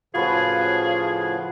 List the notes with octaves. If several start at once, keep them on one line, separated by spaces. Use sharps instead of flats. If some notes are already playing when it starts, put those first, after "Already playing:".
A2 C#3 F3 F4 F#4 G#4 B4